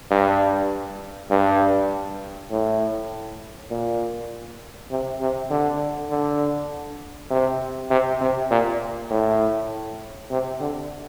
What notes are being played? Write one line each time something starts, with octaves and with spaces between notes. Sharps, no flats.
G2
G2
A2
A#2
C3
C3
D3
D3
C3
C3
C3
A#2
A2
C3
D3